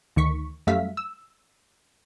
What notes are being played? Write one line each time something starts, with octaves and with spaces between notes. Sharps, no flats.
D2 D#3 C#6 B6
F#2 G3 A3 E5 F5 B6
E6